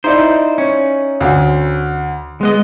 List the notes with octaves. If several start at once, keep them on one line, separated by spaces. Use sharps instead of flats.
D#4 E4 C5 D5
C#4
D2
G#3 B3 D#5